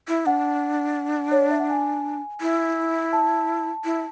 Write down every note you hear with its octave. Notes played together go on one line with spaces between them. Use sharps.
E4
D4 F#5
C#5
D5
E5
F#5
G#5
E4
A5
E4